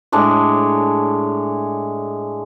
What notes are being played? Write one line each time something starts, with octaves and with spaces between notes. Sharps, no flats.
A2 G#3 D4 C#5